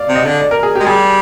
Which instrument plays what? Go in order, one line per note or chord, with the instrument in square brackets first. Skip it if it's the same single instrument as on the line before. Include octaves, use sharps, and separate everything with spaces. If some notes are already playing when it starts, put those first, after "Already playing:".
Already playing: [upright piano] D5 F5
[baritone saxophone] C3
[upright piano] D#5
[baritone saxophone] D3
[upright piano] D5
A#4
G#4
G4
[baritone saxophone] G#3
[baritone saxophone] G3 [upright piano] G#4